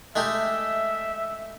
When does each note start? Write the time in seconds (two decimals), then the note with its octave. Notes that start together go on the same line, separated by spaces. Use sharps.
0.16 G#3 A3 G4 E5